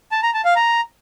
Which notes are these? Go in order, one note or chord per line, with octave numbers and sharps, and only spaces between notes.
A5
A#5
A5
F5
A#5